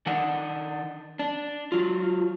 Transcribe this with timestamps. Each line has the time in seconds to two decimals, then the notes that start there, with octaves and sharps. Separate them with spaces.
0.06 D#3 D4 D#4 F#5
1.19 D4
1.72 F#3 F4